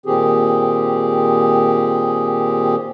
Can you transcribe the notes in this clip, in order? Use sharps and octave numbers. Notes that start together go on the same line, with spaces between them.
A#2 D#3 C4 G4 G#4